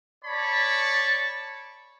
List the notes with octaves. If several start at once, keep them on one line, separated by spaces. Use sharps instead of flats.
C#5 D5 A5 B5 C#6